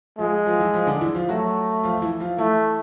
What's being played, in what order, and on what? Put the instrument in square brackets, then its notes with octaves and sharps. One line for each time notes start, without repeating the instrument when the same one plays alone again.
[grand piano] F3 F4 [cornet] G#3
[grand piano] F3 F4
E3 E4
F3 F4
D3 D4
E3 E4
F3 F4
[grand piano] F#3 F#4 [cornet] A3
[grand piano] F3 F4
F4
E3 E4
F3 F4
[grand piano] E3 E4 [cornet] A3